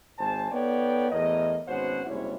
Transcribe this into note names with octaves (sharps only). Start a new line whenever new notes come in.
G#1 C5 G#5 A5
B3 D#4 A4 C#5 D5 G5
E2 A2 A#4 D#5
G#1 B2 C#4 C5 C#5 F#5
F#1 G#2 C3 G3 E4 C#5